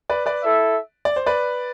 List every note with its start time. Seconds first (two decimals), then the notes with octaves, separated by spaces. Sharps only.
0.10 B4 D5
0.26 B4 D5
0.43 E4 A4 E5
1.05 D5
1.16 C5
1.26 B4 D5